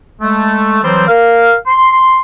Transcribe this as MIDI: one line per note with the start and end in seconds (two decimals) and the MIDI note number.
0.22 0.81 56
0.22 0.81 57
0.84 1.04 52
0.84 1.04 54
0.84 1.04 55
0.84 1.04 60
0.84 1.04 72
1.08 1.55 70
1.08 1.55 77
1.67 2.21 84